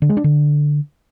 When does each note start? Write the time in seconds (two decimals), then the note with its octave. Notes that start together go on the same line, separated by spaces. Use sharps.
0.02 D3
0.09 G#3
0.17 D4
0.24 D3